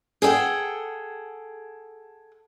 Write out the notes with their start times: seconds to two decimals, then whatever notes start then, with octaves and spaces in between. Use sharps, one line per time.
0.22 G#4 A4 D5 F#5 G5